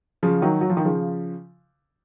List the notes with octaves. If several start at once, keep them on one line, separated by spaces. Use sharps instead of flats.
C#3 F3
D#3 F#3
F#3
F3
D#3
C#3 F3